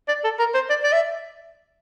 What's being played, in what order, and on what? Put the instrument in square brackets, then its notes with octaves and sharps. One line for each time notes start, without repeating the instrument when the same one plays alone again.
[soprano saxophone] D5
A4
A#4
C5
D5
D5
E5